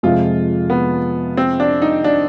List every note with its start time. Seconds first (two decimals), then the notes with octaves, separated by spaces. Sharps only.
0.03 F2 C3 F3 G#3 F4
0.70 B3
1.37 C4
1.60 D4
1.82 D#4
2.04 D4